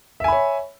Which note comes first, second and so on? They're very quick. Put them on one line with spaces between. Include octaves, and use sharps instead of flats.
E5 G#5 B5 C#5